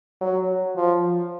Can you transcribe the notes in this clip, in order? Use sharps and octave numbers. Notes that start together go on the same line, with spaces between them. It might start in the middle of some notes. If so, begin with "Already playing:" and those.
F#3
F3